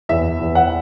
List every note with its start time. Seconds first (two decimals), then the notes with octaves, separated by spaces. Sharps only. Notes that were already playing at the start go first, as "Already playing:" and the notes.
0.09 E2 E5
0.40 E2
0.55 F#5